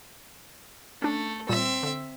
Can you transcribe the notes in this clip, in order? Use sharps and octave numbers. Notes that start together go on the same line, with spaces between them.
A3 C#4 D4
A#2 G3 C4 E5
D3